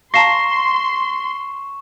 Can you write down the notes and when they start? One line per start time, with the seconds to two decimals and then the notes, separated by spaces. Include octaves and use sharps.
0.14 F5 A5 A#5 C6 C#6 A#6 C7 E7